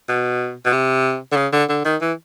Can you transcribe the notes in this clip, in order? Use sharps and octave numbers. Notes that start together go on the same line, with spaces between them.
B2
B2
C3
D3
C#3
D3
D3
D#3
E3